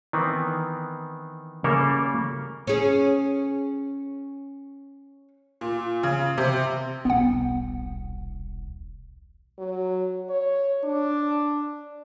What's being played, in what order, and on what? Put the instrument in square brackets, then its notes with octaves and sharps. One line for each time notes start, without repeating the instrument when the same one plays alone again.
[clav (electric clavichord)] D#3 E3 B3 C4
C#3 G3 A#3 C#4 A4 A#4
[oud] C#4 G#4
[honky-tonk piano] A#2
C#3
C3
[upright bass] D#1 B1 [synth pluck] B3 F#5
[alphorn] F#3
C#5
D4